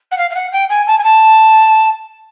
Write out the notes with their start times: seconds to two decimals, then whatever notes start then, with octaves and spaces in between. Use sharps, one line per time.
0.11 F#5
0.18 F5
0.30 F5
0.35 F#5
0.52 G5
0.69 G#5
0.87 A5
0.98 G#5
1.04 A5